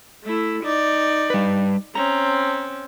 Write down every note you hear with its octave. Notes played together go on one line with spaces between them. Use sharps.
A3 E4
D#4 D5
G3 B4
C4 C#4 A#5